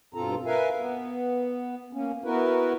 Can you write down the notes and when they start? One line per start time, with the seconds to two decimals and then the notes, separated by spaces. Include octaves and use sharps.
0.14 G2 B2 C4 F4 A4 A#5
0.46 A#4 B4 E5 F5 G#5
0.78 B3
1.93 A#3 C#4
2.24 B3 E4 F#4 A#4 B4